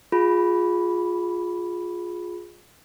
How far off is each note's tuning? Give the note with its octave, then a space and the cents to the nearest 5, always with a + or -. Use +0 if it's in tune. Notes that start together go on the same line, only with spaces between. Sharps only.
F4 +15 G#4 +0 B5 +0